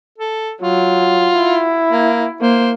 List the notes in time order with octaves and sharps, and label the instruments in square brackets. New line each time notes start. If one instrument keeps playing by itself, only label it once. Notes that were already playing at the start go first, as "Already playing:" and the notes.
[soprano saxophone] A4
[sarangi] F#3 [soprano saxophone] F4
[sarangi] E4
[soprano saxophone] A#3
[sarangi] A#3 [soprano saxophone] C5